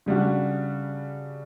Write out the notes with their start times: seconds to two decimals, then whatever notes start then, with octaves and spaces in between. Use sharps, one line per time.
0.06 C#3 G3 D4 F#4